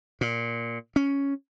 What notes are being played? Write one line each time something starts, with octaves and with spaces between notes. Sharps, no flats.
A#2
C#4